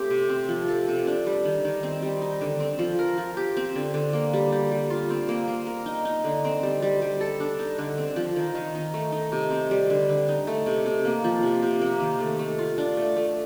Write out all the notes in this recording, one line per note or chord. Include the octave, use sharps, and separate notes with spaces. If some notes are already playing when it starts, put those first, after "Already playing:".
Already playing: A3 C4 G4
C3
C4
F3
A4
C3
D4
G3
D#3
D#3
C4
G3
D#4
D3
C4
F3
A#4
F3
G4
C4
D3
D3
A#3
G3
G3
G3
F4
C4
A#3
A#3
A#4
D#4
D#4
D3
C4
G3
G3
G3
A4
D4
D#4
D3
C4
F3
D#3
D#3
D#4
A3
D#4
C3
C4
G3
D3
D3
D#4
A3
C3
C3
A#3
F3
C3
C3
A#3
D#3
A3
A3
F4
D4
A3
A3